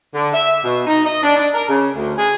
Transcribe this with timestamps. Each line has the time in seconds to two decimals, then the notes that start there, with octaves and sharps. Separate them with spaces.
0.15 D3
0.32 E5
0.63 B2
0.87 D#4
1.04 D#5
1.22 D4
1.35 D4
1.54 A#4
1.68 C#3
1.95 D2
2.17 G#4